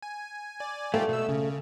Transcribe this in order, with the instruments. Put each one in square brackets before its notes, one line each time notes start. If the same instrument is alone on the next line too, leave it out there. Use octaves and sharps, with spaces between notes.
[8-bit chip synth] G#5
D5 G#5
[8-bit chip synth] G#2 F4 G4 [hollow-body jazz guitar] A3
[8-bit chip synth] B2 E6
C#3